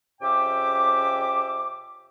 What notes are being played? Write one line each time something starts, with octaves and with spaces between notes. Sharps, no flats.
F2 C#3 G4 E5 G5 D6